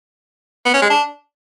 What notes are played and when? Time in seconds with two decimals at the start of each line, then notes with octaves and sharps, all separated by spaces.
0.66 B3
0.74 C#4
0.82 G#3
0.90 D4